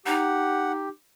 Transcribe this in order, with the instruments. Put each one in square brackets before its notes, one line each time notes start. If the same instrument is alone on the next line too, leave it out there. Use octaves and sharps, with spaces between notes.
[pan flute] D#4 [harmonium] G4 [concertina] F#5